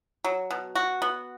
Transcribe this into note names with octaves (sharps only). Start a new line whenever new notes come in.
F#3
B2
F#4
B3